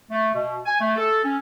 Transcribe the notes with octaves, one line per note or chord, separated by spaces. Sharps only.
A3
B2
G#5
A3
A4
C#4